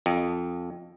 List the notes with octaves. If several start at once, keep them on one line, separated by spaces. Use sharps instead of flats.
F2